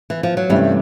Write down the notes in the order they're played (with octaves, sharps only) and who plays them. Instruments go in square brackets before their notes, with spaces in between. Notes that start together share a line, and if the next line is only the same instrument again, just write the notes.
[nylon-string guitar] E3
F3
F#3
[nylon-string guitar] G2 G3 [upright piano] C3 E3 A3 C#4